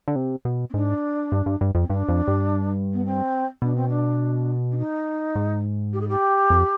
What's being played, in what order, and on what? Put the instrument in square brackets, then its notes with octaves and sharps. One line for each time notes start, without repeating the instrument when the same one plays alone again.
[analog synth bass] D3
C3
B2
[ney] C4
[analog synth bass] G#2 [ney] D4
[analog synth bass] G2
G2
G2
F2
[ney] C4
[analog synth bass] G2 [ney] D4
[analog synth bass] F2
G2
[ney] B3
C4
[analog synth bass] B2 [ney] D4
[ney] C4
D4
D4
D#4
[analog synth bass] G#2
[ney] G4
G#4
G4
[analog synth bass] F2